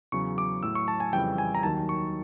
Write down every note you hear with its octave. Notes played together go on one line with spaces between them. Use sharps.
E2 C#3 F#3 C#6
D6
A2 F#3 E6
C#6
A5
G#5
F2 C#3 E3 G3 G5
G#5
A#5
D#2 D#3 F#3 A5
C#6